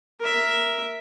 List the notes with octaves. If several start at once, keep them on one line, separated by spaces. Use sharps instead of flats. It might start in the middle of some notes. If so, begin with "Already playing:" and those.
A#4 E5